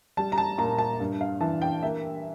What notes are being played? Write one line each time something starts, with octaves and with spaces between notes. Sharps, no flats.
G3 A5
A#5
A5
A#2 A#5
A5
G2
F5
E3 A5
G5
A#3 E5